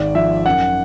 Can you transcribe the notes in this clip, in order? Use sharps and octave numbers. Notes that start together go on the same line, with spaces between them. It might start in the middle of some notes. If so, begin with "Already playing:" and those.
Already playing: G#1 D5
F3 E5
F#2 F#5